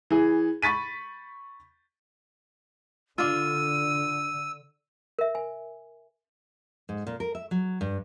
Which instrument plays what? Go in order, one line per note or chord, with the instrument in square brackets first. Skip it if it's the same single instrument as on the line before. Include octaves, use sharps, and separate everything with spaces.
[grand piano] E3 G#4
B5 C#6 A6 B6 D#7
[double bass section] D3 [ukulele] D4 F4 [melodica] E6 [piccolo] D#7
[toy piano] A#4 E5
G#5
[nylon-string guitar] G#2
A#2
A#4
E5
F#3
G2